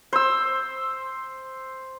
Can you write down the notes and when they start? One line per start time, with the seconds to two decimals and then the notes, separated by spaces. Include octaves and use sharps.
0.13 C5 E6